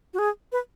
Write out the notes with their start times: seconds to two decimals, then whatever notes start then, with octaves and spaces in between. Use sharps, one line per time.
0.14 F#4
0.19 G#4
0.52 B4